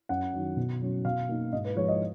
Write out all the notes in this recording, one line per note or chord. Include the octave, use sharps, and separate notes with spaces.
F#2 F#5
D#3 F#3
B2
F#3 C#4
B2 F5
A#3 D#4
G#2 D#5
B4
F3 G#3 C#5
D#5